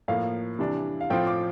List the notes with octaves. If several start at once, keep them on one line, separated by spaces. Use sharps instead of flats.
A2 F3 A#3 F5
C3 E3 G3 D4
F5
A2 F3 C4 F4 G5
D6